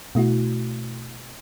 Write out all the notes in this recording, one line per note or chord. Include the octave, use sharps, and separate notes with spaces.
B2 A3 E4 F#4